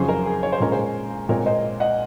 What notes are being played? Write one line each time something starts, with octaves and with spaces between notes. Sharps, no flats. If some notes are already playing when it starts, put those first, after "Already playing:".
Already playing: F2 C#3 F#3 C#4 G#4 C5
A#4
G#4
C#5
C5
A#2 G#3 C#4 A#4
G#4 C5
A#2 G#3 C4 A#4 C#5
C5 D#5
D#5 F#5